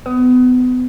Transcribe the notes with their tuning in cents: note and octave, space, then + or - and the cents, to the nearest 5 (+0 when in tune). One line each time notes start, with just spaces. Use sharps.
B3 +30